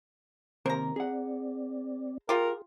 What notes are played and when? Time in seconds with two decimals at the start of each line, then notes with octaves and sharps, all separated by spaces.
0.66 D#2 C3 A#4 C5 A#5
0.96 C4 G#4 D5 F#5
2.29 F4 G4 G#4 A#4